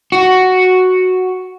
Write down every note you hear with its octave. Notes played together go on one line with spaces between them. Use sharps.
F#4